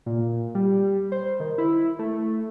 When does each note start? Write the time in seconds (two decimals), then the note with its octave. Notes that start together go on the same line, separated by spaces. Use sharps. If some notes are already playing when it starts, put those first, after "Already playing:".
0.06 A#2
0.55 G3
1.12 C5
1.40 D#3
1.58 E4
1.99 A3